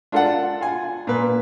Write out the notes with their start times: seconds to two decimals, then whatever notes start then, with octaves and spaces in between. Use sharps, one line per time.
0.12 D4 F4 A4 F5 F#5
0.61 F4 G#5
1.07 A#2 B4